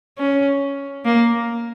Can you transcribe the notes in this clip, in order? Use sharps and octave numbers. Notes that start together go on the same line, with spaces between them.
C#4
A#3